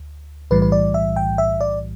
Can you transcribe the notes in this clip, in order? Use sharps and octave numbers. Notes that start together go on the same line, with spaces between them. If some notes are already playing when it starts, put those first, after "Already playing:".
Already playing: D2
B1 A2 E3 G3 B4
B4
D5
E5
G5
E5
D5